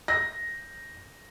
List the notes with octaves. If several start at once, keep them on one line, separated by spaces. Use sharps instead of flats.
A#6